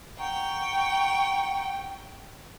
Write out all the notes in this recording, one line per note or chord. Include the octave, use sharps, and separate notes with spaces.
F#5 G5 A#5 C#6